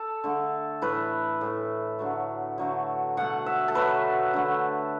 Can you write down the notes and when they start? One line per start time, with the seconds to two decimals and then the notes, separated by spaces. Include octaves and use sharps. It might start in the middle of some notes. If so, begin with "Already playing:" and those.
Already playing: A4
0.24 D3 A3
0.82 A2 E3 A3 B4
1.41 A2 E3 A3
1.99 D3 F#3 A3
2.58 D3 F#3 A3
3.17 B2 F#3 A3 F#5
3.46 E5
3.68 A4
3.75 B2 F#3 A3 B4
4.34 D3 A3